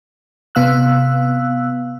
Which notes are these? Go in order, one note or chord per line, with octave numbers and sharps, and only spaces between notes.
C3 B3 F5 E6 F#6